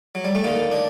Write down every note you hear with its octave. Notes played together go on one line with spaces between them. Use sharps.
F#3
G3
A3
D#2 D3 A#3
D4